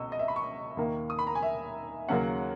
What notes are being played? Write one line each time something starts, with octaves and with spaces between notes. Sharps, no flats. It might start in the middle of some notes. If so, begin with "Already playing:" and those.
Already playing: C#2 B2 D#5 C#6 E6
D#5
E5
B5
C#6
D#2 D#3 A#3
D#6
B5
A#5
G#5
E5
D#2 C#3 F#3 A#3 C#4 F#5